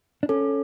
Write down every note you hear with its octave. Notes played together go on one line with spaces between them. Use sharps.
D4
C#4 A4